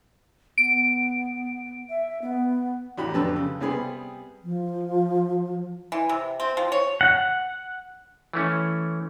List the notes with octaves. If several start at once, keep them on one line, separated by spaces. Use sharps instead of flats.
B3 D7
E5
B3
A1 F#4 G4 B5
F2 D3 G4 B4 A5 E6
C#3
C3 G3 B3 G#4 B5
F3
E3
C3
C4
F3
C#5
F#5
E3 A3 C#4